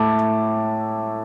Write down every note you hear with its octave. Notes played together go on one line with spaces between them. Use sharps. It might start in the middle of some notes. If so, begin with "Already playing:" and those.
Already playing: A2 A3 E4 A5 D6